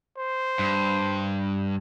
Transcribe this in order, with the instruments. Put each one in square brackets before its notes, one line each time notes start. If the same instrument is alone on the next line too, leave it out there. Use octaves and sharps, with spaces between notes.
[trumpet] C5
[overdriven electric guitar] G2